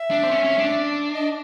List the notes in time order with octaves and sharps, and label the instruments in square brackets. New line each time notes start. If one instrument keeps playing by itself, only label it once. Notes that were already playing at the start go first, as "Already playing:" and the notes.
Already playing: [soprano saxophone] E5
[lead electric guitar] D4
C4
C#4
C#4
D4
[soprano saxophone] D#5